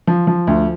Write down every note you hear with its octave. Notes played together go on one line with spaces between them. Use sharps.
F3
F3
D2